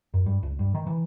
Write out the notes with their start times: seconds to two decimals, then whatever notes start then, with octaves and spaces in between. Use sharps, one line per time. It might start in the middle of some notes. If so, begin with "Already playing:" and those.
0.14 F#2
0.26 G2
0.43 C#2
0.59 G2
0.75 D#3
0.87 E3